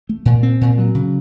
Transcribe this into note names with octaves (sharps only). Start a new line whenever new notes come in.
A3
A#2
C4
A#2
F#3
C#3